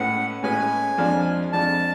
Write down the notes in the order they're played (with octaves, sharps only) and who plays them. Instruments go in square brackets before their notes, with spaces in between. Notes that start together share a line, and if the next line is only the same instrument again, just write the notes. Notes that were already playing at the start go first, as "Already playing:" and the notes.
Already playing: [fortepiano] A2 G#3 C#4 G#4 B4 [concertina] F#5
[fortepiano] A2 G#3 C#4 G#4 B4 [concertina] G#5
[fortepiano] F2 F3 G#3 D4
[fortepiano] F2 F3 G#3 D4 [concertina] A5